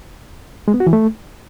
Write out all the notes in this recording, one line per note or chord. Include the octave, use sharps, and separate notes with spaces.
G#3
B3
F#4
E3
A3